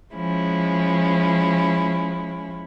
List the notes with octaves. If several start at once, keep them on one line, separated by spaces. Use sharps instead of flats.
F3 G#3 C#4 E4